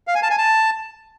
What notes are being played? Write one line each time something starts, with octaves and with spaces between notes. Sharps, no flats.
F5
G#5
A5
G#5
A5